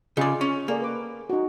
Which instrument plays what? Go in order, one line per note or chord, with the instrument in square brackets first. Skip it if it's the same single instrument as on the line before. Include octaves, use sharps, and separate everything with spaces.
[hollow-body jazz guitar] C#3 D5 [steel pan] F4 G#4 D#5
[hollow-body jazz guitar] C#4
[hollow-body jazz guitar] A#3 [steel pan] G#4 A4 D5
[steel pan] B4 D6
D#4 F#4